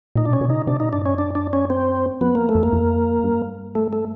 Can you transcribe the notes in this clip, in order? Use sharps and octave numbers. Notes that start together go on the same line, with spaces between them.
A#2 D#4
D4
B2
C#4
B2
C3 D#4
C#3
C3 D4
A#2 D#4
G2 D4
F#2 C#4
D4
D4
C#4
C4
F#2 B3
F2 A#3
A3
F2
A#3
F2
G2
A3
A3